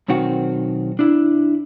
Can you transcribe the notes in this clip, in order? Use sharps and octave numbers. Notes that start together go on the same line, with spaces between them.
B1 D#3 C4 F#4 F#5
D4 E4